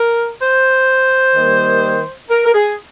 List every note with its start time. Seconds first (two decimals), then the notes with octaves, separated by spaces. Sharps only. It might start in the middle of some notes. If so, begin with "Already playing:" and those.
Already playing: A#4
0.41 C5
1.35 D#3 G3 A#3
2.30 A#4
2.46 A#4
2.54 G#4